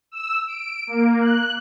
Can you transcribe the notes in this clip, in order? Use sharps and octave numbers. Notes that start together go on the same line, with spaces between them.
E6
D7
A#3
F#6